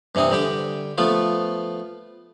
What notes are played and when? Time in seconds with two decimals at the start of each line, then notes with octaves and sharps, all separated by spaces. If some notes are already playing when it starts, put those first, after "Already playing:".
0.15 G2 C3 E3 C4 D#6
0.31 D3 G3 G4 G5
0.98 F3 A3 B3 F4